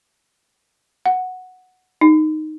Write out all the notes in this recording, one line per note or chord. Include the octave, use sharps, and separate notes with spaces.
F#5
D#4